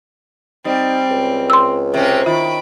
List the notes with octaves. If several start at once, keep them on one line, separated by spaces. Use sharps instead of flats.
G3 C4 D#4
C#2
C6 E6
C3 C4 C#4 G5
D#3 E4 F4 B5 D7